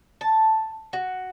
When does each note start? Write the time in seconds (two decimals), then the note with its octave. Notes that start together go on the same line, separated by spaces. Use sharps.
0.21 A5
0.93 F#4